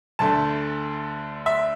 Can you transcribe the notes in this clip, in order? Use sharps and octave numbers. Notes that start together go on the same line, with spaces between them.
D2 D3 A3 A5
E5